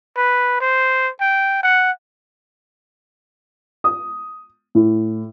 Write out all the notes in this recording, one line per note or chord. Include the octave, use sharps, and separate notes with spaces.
B4
C5
G5
F#5
D#6
A2